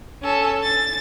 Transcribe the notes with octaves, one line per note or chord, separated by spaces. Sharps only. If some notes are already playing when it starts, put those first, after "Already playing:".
C#4 A4
A6